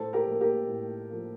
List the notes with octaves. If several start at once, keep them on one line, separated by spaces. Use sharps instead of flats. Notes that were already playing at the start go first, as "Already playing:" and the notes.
Already playing: A2 A4 C5
G4 A#4
F3 A#3
G4 A#4
A2
F3 A#3